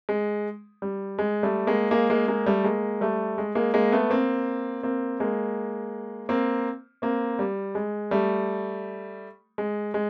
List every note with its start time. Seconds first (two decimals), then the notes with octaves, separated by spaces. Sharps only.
0.09 G#3
0.82 G3
1.19 G#3
1.43 G3 A3
1.67 G#3 A#3
1.91 G#3 A#3
2.10 G#3 A#3
2.28 G#3 A#3
2.46 G3 A3
2.64 G#3 A#3
3.01 G3 A3
3.38 G#3
3.55 G#3 A#3
3.74 G#3 A#3
3.92 A3 B3
4.10 A#3 C4
4.83 A#3 C4
5.20 G#3 A#3
6.29 A#3 C4
7.02 A#3 C4
7.39 G3
7.75 G#3
8.11 G3 A3
9.58 G#3
9.94 G#3